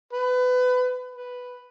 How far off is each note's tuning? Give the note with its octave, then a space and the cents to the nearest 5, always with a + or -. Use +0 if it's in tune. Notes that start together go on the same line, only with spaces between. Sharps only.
B4 +25
B4 +0